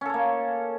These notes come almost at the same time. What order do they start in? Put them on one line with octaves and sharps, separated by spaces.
C#4 A4 C#5 A#3